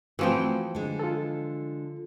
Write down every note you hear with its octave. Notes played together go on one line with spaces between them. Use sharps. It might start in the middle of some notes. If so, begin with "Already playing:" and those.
E3 F3 A3 C4 F#4 G5
D3 G#3
F4 A4